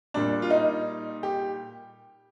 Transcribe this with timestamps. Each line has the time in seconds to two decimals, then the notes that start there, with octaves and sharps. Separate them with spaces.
0.14 A#2 G3 A#3 D4
0.42 F4
0.50 D#4
1.23 G4